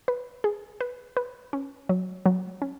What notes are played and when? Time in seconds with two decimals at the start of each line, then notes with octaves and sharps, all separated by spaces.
0.08 B4
0.44 G#4
0.81 B4
1.17 B4
1.53 C#4
1.89 F#3
2.26 F#3
2.62 C#4